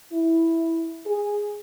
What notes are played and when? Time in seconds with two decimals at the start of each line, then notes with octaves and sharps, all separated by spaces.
0.12 E4
1.06 G#4